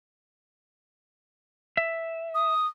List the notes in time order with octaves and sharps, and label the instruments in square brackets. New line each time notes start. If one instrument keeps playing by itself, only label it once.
[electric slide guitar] E5
[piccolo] D#6